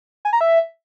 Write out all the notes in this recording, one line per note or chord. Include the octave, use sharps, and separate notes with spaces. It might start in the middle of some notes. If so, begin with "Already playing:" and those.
G#5
A#5
E5